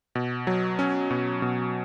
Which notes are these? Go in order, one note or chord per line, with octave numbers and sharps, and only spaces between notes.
B2
F#3
C#4
B2
B2